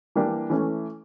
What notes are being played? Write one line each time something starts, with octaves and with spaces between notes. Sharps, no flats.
E3 G3 A#3 D4 G4
E3 A3 C#4